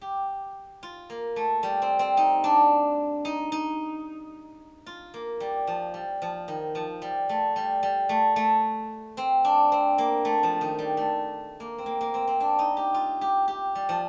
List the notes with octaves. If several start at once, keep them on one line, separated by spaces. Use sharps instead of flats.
G4
F4
A#3
A3
G3
C4
C4
D#4
D4
D#4
D#4
F4
A#3
G3
F3
G3
F3
D#3
F3
G3
A3
G3
G3
A3
A3
C4
D4
C4
A#3
A3
F3
D#3
G3
A3
A#3
C4
A#3
A#3
C4
C4
D4
D#4
G4
F4
G4
G4
G3
F3